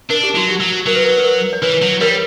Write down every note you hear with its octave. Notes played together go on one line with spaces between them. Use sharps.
D4 A#4
G4
F#3 F#4
G4
F#3
F#3 A#4
B4
A#4
B4
A#4
C#5
E3 B4
F#3
G3 A#4 C#5